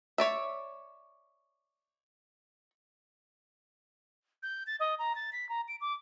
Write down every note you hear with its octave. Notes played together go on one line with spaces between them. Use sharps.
C#5 D5 E5
G6
A6
D#5
A#5
A6
B6
A#5
D7
D6